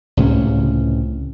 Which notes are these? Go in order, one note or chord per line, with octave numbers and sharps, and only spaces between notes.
C#2 A2 C3 C#4